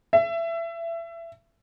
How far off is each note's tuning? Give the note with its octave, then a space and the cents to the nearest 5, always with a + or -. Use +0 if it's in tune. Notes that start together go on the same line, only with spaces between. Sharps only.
E5 +25